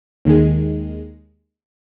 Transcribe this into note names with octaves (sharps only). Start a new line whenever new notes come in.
D#2 D#3 G#3